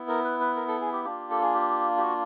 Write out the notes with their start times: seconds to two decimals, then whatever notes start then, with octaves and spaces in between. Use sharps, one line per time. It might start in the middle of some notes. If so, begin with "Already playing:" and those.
Already playing: B3 E4
0.08 A#4
0.24 B4
0.40 B4
0.56 A#4
0.68 A4
0.81 G#4
0.92 G4
1.05 A#3 D4 F4 G4
1.31 A4
1.42 G#4
1.54 G4
1.98 G4
2.02 F#4